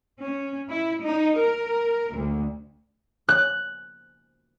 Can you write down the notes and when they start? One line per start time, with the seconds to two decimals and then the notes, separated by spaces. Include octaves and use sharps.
0.21 C#4
0.70 E4
1.05 D#4
1.38 A#4
2.14 D2
3.29 F#6